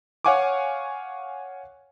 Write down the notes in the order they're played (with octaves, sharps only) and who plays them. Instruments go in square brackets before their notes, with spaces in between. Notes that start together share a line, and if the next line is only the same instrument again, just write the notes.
[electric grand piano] C#5 F5 F#5 G#5 C#6 D6